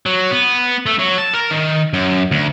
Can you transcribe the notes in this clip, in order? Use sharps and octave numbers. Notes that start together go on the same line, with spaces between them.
F#3
B3
A3
F#3
A5
A#4
D#3
F#2
D2